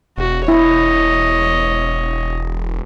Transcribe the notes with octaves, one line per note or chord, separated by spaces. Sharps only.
E1 F#4
E4 C#5 D#5